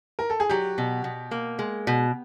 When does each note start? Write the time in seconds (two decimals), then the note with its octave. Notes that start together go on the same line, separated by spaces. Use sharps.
0.19 A#4
0.30 A4
0.40 G#4
0.49 F#3 G4
0.78 B2
1.04 B2
1.31 A#3
1.59 G#3
1.87 B2